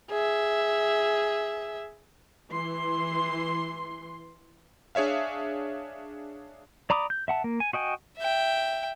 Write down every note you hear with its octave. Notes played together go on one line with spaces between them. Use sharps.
G#4 E5
E3 C6
D4 G#4 C#5 E5 F5
D5 A#5 B5 D6 D#6
G6
E5 F#5 A5
A#3
G#5
F#4 D#5 G5 G#5
E5 G5